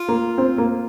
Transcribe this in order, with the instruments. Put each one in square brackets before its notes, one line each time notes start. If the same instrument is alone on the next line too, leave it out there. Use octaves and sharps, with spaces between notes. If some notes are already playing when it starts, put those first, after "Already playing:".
Already playing: [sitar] F4
[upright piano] A#3
C4
A#3